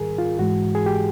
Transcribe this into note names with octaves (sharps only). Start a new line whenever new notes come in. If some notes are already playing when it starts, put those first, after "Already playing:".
Already playing: G#2 D#3 G3 G#4 A#4
F4
G#2 E3 G#3 F#4
G#4
G4